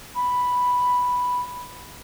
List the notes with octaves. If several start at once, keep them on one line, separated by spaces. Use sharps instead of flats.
B5